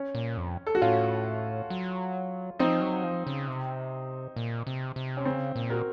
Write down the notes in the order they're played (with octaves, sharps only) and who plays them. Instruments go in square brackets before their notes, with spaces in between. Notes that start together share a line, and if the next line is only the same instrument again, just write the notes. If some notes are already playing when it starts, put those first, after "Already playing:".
Already playing: [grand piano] C#4
[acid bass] A#2
F2
[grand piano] A4
F#4
[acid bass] A2 [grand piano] C#4 F4
[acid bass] F#3
[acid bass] F3 [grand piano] C4 D#4
[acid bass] F#3
F3
C#3
C3
A#2
C3
C3
[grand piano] C#4
[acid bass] C#3 [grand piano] C4
[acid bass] A#2
[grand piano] F#4 A#4